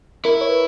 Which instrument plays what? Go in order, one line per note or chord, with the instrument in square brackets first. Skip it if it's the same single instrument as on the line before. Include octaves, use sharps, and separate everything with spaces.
[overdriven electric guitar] E4 [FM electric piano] A#4
[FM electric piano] C#5
B4